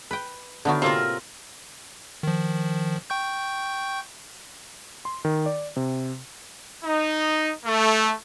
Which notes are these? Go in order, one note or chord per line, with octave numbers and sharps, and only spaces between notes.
B4 G5
A2 D3 D#3 B3 F#4
A2 C3 A#3 C4 F4 A#4
D#3 F3
G5 C#6 G6
C6
D#3
D5
C3
D#4
A3